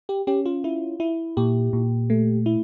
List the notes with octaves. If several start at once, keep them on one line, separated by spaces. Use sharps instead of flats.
G4
C#4 G4
F4
E4
E4
A#2 G4
A#2
A3
E4